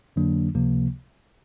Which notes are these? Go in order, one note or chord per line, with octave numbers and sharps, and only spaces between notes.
F2 D3 F#3 A#3 D4
C#2 C3 F3 A#3